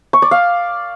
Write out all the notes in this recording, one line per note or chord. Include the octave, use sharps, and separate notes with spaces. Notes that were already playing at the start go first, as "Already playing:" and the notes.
C#6
D5
F5